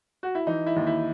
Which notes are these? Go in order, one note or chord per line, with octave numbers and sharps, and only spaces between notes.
F#4
E4
E3 D#4
E4
D#2
E4